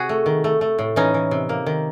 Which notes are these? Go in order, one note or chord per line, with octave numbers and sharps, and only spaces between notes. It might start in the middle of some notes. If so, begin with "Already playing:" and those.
Already playing: C3 F#4 G#4
A3
D#3
A3
A3
A2
E3 C#4 D#4
E3
C3
A#3
D#3